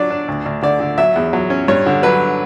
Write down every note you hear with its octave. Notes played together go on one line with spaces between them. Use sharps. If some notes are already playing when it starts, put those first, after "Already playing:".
Already playing: F#3 D4 D5
D4
D2
D2
D3 D5
D3
F#3 E5
E2
F#3
C#4
G2 C#5
D3
F#3 B4